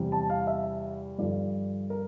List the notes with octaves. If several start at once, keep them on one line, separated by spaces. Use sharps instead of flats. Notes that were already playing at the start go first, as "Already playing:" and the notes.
Already playing: E2 C3 G3
A5
F5
E5
G2 D3 F3 D5
A#4